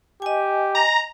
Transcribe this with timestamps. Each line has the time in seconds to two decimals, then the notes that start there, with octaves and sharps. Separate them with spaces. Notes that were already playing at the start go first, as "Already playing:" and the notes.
0.22 G4 D#5 G#5
0.75 A#5